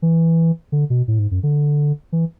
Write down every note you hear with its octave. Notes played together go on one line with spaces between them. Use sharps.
E3
D3
B2
A2
G#2
F#2
D3
E3